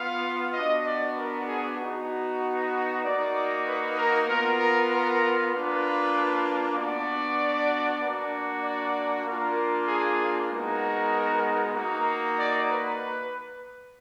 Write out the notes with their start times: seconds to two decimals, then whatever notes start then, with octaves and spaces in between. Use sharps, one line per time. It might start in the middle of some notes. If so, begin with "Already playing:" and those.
Already playing: B3 F4 F5
0.54 B3 D4 F#4 D#5
0.85 D5
1.16 A#4
1.47 G#4
1.79 B3 D#4 F#4
2.40 B4
3.03 A#3 D#4 F#4 D5
3.66 B4
3.96 A#4
4.27 B3 F4 A#4
4.59 A#4
4.90 A#4
5.52 A#3 D4 F4 B4
6.76 B3 D4 F#4 D5
8.01 A#3 D4 F#4
8.63 D5
9.25 A#3 D4 F4 A#4
9.88 G#4
10.50 G#3 B3 D#4 F#4 A#4
11.74 A#3 D#4 F#4
12.37 D5
12.69 B4